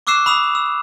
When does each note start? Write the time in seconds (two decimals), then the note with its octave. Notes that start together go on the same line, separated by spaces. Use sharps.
0.07 C#6 D6 E6 F#6 C7 E7
0.26 B5 D#6 E6 F7
0.55 E6